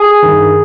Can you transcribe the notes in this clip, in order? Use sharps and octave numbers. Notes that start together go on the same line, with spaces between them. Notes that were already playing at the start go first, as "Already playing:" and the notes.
Already playing: G#4
G2 D#3